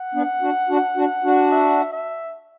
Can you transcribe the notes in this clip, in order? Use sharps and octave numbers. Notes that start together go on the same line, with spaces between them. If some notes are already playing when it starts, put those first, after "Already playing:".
Already playing: F#5
B3 D4
D4 F#4
D4 F#4
D4 F#4
D4 F#4
E5
E5